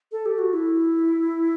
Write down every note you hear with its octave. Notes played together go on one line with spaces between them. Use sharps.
A4
G4
F#4
E4